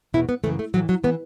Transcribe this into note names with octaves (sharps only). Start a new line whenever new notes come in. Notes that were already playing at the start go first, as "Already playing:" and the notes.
E2 B2 E4
B3
F#2 C#3 E3 A3
A3
A2 E3 F#3
F#3
E3 B3